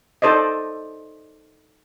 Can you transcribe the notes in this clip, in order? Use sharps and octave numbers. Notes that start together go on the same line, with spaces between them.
D#4 A4 C5 D5 D#5